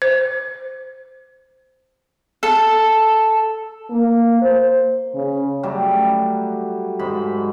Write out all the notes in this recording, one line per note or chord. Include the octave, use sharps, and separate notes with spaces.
C5
A4
A#3
C5
C#3
F#3 G3 A3
G#2 F#3 B5